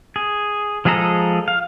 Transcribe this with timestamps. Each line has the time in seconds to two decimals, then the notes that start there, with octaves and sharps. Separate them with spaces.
0.16 G#4
0.85 F3 G#3 G#4 A4 A#5
1.48 F5